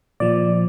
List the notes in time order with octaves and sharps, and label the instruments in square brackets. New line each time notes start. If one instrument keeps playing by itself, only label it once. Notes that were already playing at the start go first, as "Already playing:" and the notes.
[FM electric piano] A#2 F3 D5